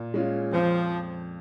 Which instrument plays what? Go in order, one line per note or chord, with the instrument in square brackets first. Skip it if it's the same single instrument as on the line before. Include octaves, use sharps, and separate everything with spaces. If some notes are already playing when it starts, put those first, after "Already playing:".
Already playing: [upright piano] A#2
G#3 C#4 F4
[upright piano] F2 [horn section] F3